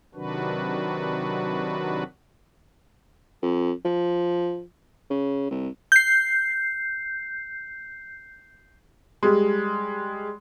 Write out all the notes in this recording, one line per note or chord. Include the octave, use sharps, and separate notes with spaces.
C3 D#3 F#3 D4 F#4 B4
F2
F3
C#3
C2
G6 C7
G3 G#3